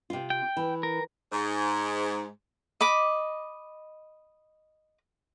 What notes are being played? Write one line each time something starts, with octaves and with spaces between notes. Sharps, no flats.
C3 F4
G5
E3
A#4
G#2
D#5 B5 D6